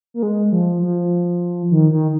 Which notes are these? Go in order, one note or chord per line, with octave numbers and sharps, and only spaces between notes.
A#3
G#3
F3
F3
D#3
D#3